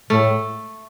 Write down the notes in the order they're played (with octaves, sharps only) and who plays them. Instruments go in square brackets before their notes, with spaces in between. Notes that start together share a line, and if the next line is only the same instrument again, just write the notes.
[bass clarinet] A2 [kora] A3